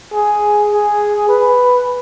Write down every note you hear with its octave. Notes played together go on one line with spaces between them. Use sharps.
G#4
G#4
B4